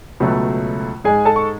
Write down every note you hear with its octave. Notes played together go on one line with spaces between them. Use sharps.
C#2 B2 F#3 A3
G#2 G#3 G#4 G#5
A4 A5
C#6